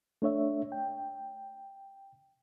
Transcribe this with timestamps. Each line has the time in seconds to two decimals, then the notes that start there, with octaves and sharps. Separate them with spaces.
0.22 A3 D4 C#5 E5
0.72 G5